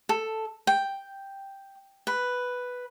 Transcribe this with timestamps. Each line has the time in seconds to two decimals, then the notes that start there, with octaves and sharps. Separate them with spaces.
0.09 A4
0.67 G5
2.07 B4